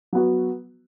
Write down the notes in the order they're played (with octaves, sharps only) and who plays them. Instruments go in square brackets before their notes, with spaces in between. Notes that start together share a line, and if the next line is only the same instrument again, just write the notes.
[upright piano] F#3 B3 F#4